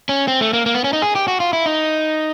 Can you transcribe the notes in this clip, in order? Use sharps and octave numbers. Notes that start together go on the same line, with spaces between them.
C#4
C4
A3
A#3
A#3
B3
C#4
D#4
G#4
G4
F#4
F4
E4
D#4